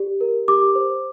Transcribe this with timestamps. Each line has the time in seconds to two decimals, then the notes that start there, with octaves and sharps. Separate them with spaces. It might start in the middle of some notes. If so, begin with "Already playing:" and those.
Already playing: G4 D5
0.21 A#4
0.48 G4 D6
0.75 C5